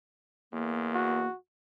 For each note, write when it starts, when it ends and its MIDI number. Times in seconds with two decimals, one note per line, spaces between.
0.52 1.27 40
0.52 1.27 58
0.94 1.36 66